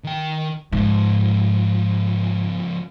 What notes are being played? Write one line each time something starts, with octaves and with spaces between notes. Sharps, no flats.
D#3 G5
C#2 G#2 F3